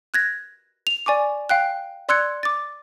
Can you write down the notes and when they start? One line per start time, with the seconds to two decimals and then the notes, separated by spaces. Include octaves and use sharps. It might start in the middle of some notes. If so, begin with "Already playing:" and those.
0.14 F#6 G#6 A#6
0.87 F7
1.06 D5 G#5 C#6 D6
1.49 F5 G5 F#6
2.09 D5 C6 E6 F#6 G#6 C#7
2.43 D6 A6